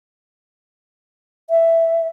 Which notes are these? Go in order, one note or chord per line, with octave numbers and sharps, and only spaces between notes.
E5